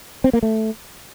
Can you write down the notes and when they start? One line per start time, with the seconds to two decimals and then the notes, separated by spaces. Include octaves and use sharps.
0.24 C4
0.33 A#3
0.43 A3